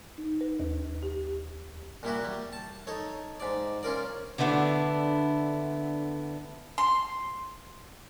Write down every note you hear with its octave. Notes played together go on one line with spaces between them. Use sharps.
D#4
B4
D#2
G4
A#2 G3 E4 F#4
G3
A5
D#4 A4 C#5
G#2 D5
C#4 F4 A#4 D5
D3 A3 B3 D4 E4
C6